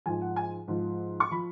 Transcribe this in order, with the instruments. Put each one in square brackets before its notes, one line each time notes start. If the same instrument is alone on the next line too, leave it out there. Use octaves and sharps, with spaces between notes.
[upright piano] G#2 F3 G#5
F#5
G#5
G#2 F3
C#6
F3 B5